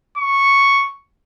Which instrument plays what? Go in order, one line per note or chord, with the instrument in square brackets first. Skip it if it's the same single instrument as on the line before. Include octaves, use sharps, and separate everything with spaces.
[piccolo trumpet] C#6